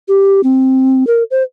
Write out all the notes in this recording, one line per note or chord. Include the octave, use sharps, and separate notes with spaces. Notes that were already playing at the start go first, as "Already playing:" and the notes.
G4
C4
A#4
C5